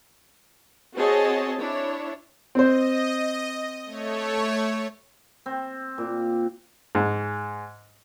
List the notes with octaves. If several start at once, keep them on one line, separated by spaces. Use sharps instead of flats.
C4 F#4 G#4 C#5 D#5 A5
D4 E4 C#5
C4 C5 D#5
A3 C#5
C4
A#2
G#2